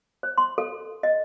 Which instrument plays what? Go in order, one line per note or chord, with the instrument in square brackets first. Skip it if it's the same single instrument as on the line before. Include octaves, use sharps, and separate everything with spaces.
[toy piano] C5
C6
A4
D#5